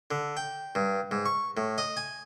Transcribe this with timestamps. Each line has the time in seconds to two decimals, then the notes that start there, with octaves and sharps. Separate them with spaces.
0.11 D3
0.37 G5
0.75 G2
1.11 G#2
1.26 C#6
1.57 A2
1.78 D#5
1.97 G#5